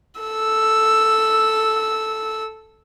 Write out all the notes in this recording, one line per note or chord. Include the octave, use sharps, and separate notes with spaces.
A4 E6